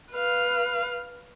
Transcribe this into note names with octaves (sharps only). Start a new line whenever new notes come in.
B4 F5